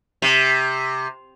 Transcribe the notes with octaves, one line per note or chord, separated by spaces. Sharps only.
C3